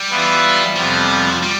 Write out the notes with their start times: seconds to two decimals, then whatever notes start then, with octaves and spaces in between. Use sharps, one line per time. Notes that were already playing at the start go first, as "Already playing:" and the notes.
Already playing: G3
0.10 E3 B3 F4 B4 E5
0.76 F2 C3 F3 G3 B3
1.43 G3